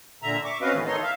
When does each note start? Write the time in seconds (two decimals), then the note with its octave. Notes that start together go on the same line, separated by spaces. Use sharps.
0.22 A#2 D3 E5 A#5
0.44 E5 C#6 D6
0.61 C4 C#4 F#4 B4 D#5 F5
0.74 A2 D#3 E3 A3 B3
0.86 D#3 D#4 A4 C#5 D#5 C6
1.03 E5 F5